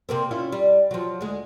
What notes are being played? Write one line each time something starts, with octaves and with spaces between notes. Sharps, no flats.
C3 A#3 C4
C#4 E4 F4
G3
F3 F#3
D2 G#3